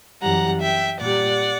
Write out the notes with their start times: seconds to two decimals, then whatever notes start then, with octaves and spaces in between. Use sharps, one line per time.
0.22 F#2 E3 G3 F#5 A#5
0.61 E5 G5
1.00 A#2 G3 D5 F#5